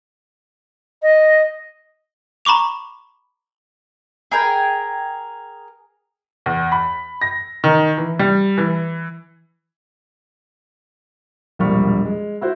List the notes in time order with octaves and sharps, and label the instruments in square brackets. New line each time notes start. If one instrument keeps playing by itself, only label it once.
[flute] D#5
[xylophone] A#5 B5 C#6 D6 F7
[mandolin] G#4 A#4 G5 G#5
[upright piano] E2
B5
A#6
D#3
E3
G3
E3
[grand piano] E1 A#1 G3 A#3 C#6 F6
G#3
E4 F#4 C5